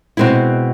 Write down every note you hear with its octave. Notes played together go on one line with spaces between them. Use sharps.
B2 G#3 C4 E4